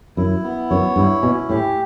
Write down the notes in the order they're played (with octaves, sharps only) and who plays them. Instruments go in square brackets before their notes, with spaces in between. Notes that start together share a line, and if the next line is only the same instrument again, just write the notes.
[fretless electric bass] F#2 [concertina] E4
[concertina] B3
[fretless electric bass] F#2 [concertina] C#5
[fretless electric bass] G2 [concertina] E4
[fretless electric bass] B2 [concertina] C#4
[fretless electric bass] A2 [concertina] G4